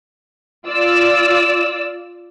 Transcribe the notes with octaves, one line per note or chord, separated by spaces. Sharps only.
F4 D5 E6